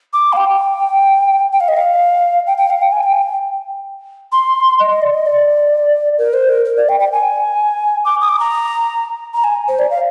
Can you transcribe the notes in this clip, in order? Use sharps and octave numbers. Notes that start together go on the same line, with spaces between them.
D6
F5
G5
G5
F5
D#5
F5
G5
G5
F5
G5
G#5
G5
C6
D#5
D#5
D5
D#5
D5
A#4
C5
A#4
A#4
D5
G5
G5
G#5
D6
D#6
D6
A#5
A#5
G#5
C5
D5
F5